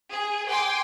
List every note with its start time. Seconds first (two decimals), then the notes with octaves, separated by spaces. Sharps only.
0.11 G#4
0.48 G5 G#5 C6 D6